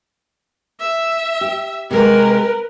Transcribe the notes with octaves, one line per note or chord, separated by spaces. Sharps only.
E5
G4
C3 G#3 A#4 B4